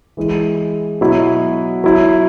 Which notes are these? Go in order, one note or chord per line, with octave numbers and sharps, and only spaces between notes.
E3 G#3 E4
B2 F#3 E4
F#3 E4